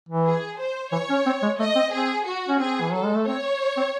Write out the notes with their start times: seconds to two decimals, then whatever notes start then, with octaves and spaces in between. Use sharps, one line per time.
0.09 E3
0.25 G#4
0.59 C5
0.92 E3 C#5
1.10 C#4
1.26 C4
1.42 G#3
1.59 A3 D#5
1.76 C4
1.93 C4 G#4
2.26 F#4
2.48 C#4
2.59 C4 G#4
2.81 E3
2.93 F#3 A4
3.04 G#3
3.15 A3
3.27 C4 C#5
3.77 C4